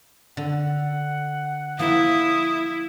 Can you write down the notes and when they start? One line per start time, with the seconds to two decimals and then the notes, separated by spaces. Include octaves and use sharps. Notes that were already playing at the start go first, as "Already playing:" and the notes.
0.37 D3 F#5
1.79 F3 A#3 E4 D#6